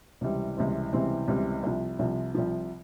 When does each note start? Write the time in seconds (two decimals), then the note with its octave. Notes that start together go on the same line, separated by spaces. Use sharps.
0.21 C#2 C3 E3 G3 C4
0.57 C#2 C3 E3 G3 C4
0.93 C#2 C3 E3 G3 C4
1.28 C#2 C3 E3 G3 C4
1.63 C2 C3 F3
1.99 C2 C3 F3
2.35 C2 C3 F3